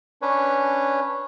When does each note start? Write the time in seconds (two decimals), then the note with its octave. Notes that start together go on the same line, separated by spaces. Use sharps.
0.22 C#4 D4 B4 C#5